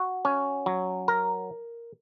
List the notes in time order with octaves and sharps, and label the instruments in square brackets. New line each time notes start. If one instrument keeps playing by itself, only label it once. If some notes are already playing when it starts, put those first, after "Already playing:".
Already playing: [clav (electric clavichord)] F#4
C#4
F#3
A#4